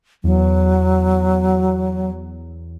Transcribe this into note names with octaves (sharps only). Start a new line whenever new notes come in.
E2 F#3